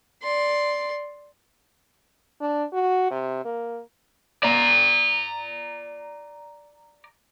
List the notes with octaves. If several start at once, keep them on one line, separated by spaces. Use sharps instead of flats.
D5 C6
D4
F#4
C3
A#3
D5 A#5